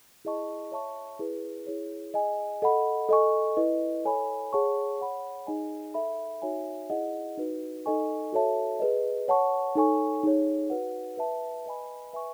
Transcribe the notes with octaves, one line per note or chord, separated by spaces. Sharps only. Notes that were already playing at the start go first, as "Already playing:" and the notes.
E4 G#4 D#5 A5 C#6
C#5 E5 A5 C#6
E4 G#4 B4
E4 G#4 C#5
G#4 D#5 G#5
A4 D#5 F#5 B5
A4 D#5 G#5 C#6
E4 B4 D#5
A4 C#5 G#5 B5
G#4 C#5 F#5 A5 C#6
C#5 F#5 B5
D#4 G#4 D#5 G#5
A4 E5 B5
D#4 F#4 C#5 E5 G#5
E4 G#4 D#5 F#5
D#4 F#4 B4
D#4 A4 D#5 G#5 C#6
F#4 A4 C#5 E5 A5
G#4 B4 D#5
C#5 F#5 A5 C#6
D#4 A4 C#5 G#5 C#6
D#4 G#4 C#5
F#4 B4 F#5
B4 E5 A5
B4 D#5 G#5 B5
B4 E5 G#5 C#6